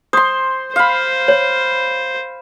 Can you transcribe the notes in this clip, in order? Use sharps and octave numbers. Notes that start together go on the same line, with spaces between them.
C5 C6 D#6
C5 F5 B5
C#5